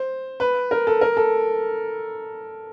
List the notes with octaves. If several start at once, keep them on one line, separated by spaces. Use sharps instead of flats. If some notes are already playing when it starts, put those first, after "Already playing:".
Already playing: C5
B4
A#4
A4
A#4
A4